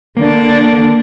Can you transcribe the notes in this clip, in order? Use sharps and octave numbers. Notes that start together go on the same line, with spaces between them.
D3 A#3 D4